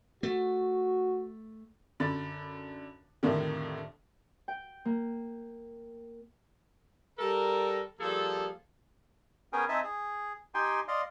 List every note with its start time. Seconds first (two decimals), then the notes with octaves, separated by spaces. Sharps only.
0.23 A3 F#4
2.00 F#2 D3 B5 A6
3.23 C2 F2 A2 D3 D#3
4.48 G5
4.85 A#3
7.19 G3 A4 A#4
8.00 F3 G3 A#3 G#4 A4
9.53 B3 C#4 G#4 A#4 G5 G#5
9.69 C4 D#4 D#5 E5 G#5 A5
9.84 G#4
10.54 D#4 G4 G5 G#5 C6
10.88 D5 D#5 F5 C6